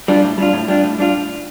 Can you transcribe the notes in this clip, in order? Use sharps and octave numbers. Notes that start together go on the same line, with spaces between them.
G3 D4 F4
A2
G3 D4 F4
A2
G3 D4 F4
A2
G3 D4 F4